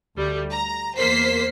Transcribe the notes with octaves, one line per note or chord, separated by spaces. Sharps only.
D2 G3 A3
A#5
E2 A#3 C5 B6 C7